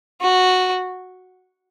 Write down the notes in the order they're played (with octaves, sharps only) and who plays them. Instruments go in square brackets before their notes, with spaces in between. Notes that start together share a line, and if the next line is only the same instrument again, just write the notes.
[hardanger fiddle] F#4